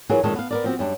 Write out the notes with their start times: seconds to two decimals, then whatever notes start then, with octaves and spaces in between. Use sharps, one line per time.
0.09 E3 F#3 F4 F#4 G#4 A#4
0.24 F2 A#2 D#3 G#3 C#5 A5
0.36 B3 F5
0.51 B3 A#4 D5
0.64 F3 C4 F#4
0.79 F#2 G3 D4